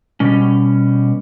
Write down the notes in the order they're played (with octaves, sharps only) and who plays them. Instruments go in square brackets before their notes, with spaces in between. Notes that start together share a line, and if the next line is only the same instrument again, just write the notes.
[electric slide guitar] B2 G3 C#4